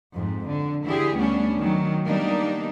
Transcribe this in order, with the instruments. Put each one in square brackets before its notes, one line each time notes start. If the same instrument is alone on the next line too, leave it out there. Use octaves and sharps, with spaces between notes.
[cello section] F2 G#2
D3
D3 E3 E4 G4 G#4
D2 G3 A3 B3 C#4 D4
D#3 F#3
D#3 G3 A#3 B3 D4 D#4